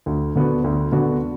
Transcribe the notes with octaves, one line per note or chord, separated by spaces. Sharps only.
D2
D3 B3 F#4
D2
D3 B3 F#4